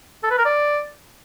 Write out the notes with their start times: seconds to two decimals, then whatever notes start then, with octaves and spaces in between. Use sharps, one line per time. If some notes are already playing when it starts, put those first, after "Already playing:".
0.23 A4
0.31 B4
0.38 A#4
0.45 D5